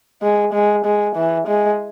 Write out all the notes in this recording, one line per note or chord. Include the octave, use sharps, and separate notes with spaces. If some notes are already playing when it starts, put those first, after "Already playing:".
G#3
G#3
G#3
E3
G#3